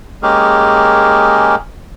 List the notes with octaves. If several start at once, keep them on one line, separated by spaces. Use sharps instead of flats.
G#3 A#3 C#4 G4 G#4 A#4